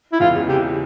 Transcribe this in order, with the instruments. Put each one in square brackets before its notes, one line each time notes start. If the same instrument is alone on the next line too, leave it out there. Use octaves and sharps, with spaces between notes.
[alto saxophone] E4
[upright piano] E2 E3 [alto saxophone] F4
[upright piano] C#2 C#3
[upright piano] C3 [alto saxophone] G4